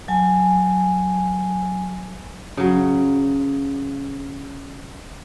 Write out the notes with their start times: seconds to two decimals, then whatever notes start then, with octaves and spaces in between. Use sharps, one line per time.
0.08 F#3 G#5 A5
2.57 C#3 F#3